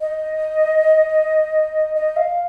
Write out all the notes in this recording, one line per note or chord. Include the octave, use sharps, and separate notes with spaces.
D#5
D#5
F5